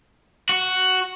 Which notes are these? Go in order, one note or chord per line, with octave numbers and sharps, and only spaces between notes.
F#4